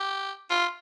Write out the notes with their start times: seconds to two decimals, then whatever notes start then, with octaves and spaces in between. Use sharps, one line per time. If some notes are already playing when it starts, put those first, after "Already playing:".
Already playing: G4
0.50 F4